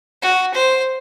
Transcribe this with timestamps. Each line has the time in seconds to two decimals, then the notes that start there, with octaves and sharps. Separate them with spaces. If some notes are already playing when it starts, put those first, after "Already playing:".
0.22 F#4
0.54 C5